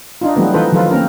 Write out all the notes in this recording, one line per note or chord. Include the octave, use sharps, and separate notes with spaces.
D4 D#4 F4
E3 F#3 G3 A3 B3 C4
E3 D#4 F4 A4 B4 C5
D#3 F3 F#3 F4 A4 B4
A#3 C4 C#4 A#4